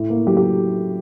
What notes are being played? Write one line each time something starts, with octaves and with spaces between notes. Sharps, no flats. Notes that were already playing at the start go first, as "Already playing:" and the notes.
Already playing: A2
A#3
F#3 G4
G4